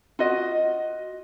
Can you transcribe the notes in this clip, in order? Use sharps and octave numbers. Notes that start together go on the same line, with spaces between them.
F4 F#4 D#5